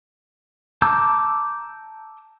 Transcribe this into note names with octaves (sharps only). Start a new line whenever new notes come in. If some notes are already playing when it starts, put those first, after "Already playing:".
A5 A#5 D6 E6 G6